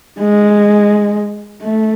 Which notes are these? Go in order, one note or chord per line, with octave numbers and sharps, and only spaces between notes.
G#3
A3